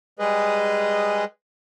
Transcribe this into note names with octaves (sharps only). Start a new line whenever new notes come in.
G3 G#3 G#4 B4 D#5